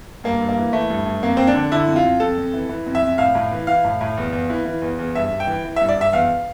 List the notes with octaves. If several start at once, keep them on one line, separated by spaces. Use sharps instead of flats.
G2 A#3
G2
A#3
E3
E3 A3
G2
G2
F2 A#3
F2 C4
D4
D3
D3 E4
F2
F4
F2
F2 A4
F2
E3
E3
F2
E5
F2
A2 F5
A2
E3
E3 F5
A2
A2
E2
E2
E3
E3
E2
E2
G2 E5
G2
G5
E3
E3
G2 E5
D5
G2
E5
E2 F5